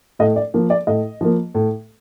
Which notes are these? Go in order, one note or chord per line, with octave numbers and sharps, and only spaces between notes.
A2 D#5
D5
F3 A#3
D5
A2 D#5
F3 A#3
A2